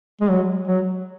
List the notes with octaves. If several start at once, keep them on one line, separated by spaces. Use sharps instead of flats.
G#3
F#3
F#3